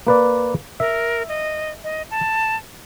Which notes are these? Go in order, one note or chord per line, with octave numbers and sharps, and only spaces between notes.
A#3 B4 D5
A#4 E5
D#5
D#5
A5